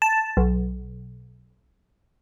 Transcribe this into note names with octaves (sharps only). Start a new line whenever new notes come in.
A5
B1